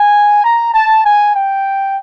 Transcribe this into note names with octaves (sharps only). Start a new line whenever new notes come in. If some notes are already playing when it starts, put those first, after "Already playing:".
Already playing: G#5
A#5
A5
G#5
G5